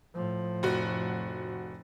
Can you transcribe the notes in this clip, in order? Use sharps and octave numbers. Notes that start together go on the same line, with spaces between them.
A2 F3
F1 F#4